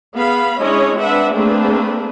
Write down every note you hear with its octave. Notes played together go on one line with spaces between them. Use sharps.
B3 G#4 F5 B5
G#3 C#4 D4 E4 C#5 D#5
C4 D4 B4 E5 F#5
A3 A#3 C4 D4 G#4 B4